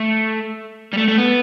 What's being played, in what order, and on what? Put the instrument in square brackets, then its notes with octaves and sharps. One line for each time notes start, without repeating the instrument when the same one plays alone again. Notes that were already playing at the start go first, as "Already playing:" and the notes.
Already playing: [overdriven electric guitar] A3
G3
A3
A3
B3